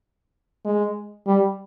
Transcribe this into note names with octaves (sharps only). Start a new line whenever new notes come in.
G#3
G3